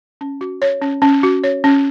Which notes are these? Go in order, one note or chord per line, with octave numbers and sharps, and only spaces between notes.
C#4
F#4
C#5
C#4
C#4
F#4
C#5
C#4